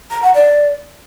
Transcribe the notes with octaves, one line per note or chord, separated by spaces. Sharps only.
A#5
F#5
D5